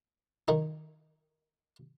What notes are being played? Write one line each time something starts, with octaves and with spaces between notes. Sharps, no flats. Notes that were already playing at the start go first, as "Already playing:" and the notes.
D#3 D#4